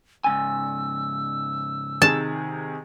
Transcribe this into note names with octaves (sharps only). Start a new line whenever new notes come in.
G#2 C#3 G#5 E6
C3 D#3 G#4 A5